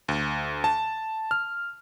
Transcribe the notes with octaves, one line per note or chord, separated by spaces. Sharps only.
D2
A5
F6